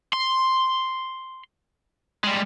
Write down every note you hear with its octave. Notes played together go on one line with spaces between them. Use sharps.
C6
G3 G#3